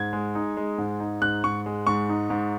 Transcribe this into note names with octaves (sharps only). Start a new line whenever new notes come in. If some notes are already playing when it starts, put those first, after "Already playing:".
Already playing: G#2 G#6
G#3
D#4
G#3
G#2
D#4
G#2 F#6
G#2 C#6
G#3
G#2 C#6
D#4
G#2